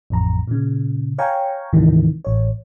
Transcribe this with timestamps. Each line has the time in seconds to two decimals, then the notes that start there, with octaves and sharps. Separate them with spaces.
0.10 A1 F2 A#5
0.48 A#2 C#3
1.18 C#5 F5 G5 G#5 A#5 C#6
1.73 D2 G#2 C3 D#3 E3
2.25 A1 C#5